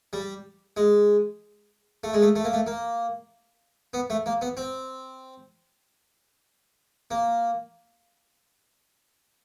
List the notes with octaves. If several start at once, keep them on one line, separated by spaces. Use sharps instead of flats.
G3
G#3
A3
G#3
A3
A3
A#3
A3
A#3
B3
A3
A#3
B3
C4
A#3